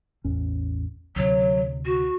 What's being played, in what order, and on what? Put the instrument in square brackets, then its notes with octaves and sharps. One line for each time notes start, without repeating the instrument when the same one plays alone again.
[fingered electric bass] A1 E2 C#4
[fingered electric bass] D2 C3 [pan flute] F#3
[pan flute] F#4